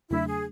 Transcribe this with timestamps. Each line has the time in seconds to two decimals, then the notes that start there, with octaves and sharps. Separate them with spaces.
0.10 E2 C#3 F#3 A3 D4 E4
0.28 G#4